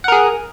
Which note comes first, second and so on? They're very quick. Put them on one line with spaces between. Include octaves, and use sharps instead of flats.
F#5 A#4 G#4